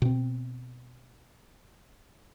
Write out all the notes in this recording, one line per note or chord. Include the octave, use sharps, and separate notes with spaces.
B2 C4